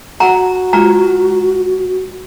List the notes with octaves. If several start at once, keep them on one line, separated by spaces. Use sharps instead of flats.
F#4 F#5 A#5
G#3 F4 A#5